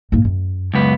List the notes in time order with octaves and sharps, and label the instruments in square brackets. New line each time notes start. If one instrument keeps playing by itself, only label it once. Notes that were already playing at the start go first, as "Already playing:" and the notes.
[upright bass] G#2 A#3
F#2
[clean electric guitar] C#2 F#2 B3